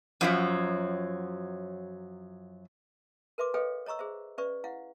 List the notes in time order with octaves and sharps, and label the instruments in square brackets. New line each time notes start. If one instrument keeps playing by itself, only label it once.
[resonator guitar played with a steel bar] F#2 F3 F#3
[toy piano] A#4 B4 E5 C6 D6
A4 B4 C#5 D#5 F5 G5
C#5 D#5 A#5 C#6 E6
G#4 C5 E5
C#4 B4 D5 E5 C#6
E4 F5 F#5